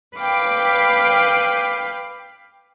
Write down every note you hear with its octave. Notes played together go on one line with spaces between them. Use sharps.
B4 F5 G5 D6